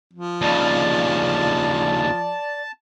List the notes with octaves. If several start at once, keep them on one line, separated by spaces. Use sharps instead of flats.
F3
D#2 C#3 D5 A5